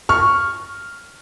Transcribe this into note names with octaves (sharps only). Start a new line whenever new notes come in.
C#6 F6